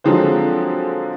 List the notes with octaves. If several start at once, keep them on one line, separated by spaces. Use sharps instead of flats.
D3 F3 F#3 G#3 C4 C5